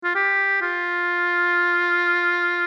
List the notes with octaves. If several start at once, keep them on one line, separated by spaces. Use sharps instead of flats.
F4
G4
F4